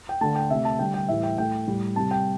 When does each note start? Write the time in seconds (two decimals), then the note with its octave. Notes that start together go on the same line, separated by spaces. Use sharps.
0.09 G5
0.21 D3 A3 A5
0.35 G5
0.50 C3 A3 E5
0.65 A5
0.79 D3 G3 G5
0.94 G5
1.08 A2 E3 G3 E5
1.23 G5
1.38 A2 A3 G5
1.67 A2 G3
1.96 C3 G3 A5
2.11 G5